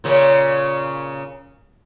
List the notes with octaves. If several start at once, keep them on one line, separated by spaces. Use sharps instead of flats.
A#2 C#3 C#4